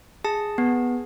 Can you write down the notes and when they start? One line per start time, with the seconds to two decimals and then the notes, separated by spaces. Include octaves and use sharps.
0.24 G#4 A5
0.58 B3